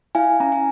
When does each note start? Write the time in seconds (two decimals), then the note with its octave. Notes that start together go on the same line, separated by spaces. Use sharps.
0.15 E4 F5 G#5
0.40 C#4 A#5
0.52 G#5